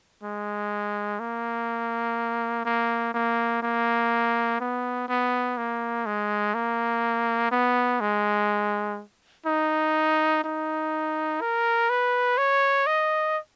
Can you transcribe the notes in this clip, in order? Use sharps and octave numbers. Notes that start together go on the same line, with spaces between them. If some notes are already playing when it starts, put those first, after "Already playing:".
G#3
A#3
A#3
A#3
A#3
B3
B3
A#3
G#3
A#3
B3
G#3
D#4
D#4
A#4
B4
C#5
D#5